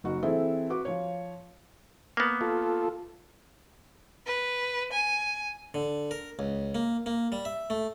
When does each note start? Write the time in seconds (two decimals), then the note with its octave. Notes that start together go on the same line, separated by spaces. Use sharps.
0.04 F#1 D#4 F#4
0.22 E3 C4 E4 G#4 A4 C5
0.70 F#4 B4 D6
0.85 F3 C#5
2.17 A#3 B3
2.41 F4 A4
4.26 B4
4.93 G#5
5.74 D3
6.11 A#4
6.39 C#2
6.75 A#3
7.06 A#3
7.32 G3
7.45 E5
7.70 A3